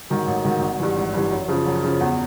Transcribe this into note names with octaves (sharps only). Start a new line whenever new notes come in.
G#2 D#3 F#3
A1
G#2 D#3 F#3
G#1
G2 E3
G#1
G2 E3
F#2
C#3 F3
F#2
C#3 F3
E2